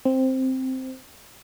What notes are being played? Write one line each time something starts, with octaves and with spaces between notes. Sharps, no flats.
C4